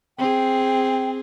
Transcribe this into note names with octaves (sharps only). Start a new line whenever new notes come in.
C4 G#4 G5